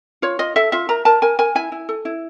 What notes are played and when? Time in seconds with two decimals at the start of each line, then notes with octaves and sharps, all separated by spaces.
0.22 F4 C#5
0.39 F4 D#5
0.56 A4 E5
0.72 F4 E5
0.89 A#4 A#5
1.05 A#4 A5
1.22 A#4 G#5
1.39 A#4 G#5
1.55 E4 G#5
1.72 E4
1.89 A4
2.05 E4